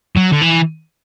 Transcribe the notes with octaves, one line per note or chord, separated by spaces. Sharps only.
F#3
D3
E3